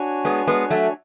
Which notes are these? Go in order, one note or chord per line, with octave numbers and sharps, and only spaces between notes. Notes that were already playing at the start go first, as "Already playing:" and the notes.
Already playing: D4 F#4 C#5 G#5
G#3 B3
G#3 B3
F#3 A3